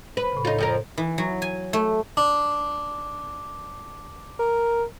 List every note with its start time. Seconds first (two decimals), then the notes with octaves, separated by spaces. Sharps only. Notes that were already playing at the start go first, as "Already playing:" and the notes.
0.17 B4
0.32 A2 C#3
0.45 D#4 F4 A4 C#5
0.58 F2 F3 A#4
0.98 E3
1.18 F#3
1.42 G#5
1.73 A3
2.17 D4
4.39 A#4